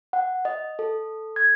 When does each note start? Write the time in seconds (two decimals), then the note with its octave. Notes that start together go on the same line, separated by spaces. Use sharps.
0.13 F#5
0.45 D#5
0.79 A4
1.36 G#6